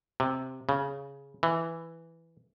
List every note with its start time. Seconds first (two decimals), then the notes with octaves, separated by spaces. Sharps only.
0.20 C3
0.69 C#3
1.43 E3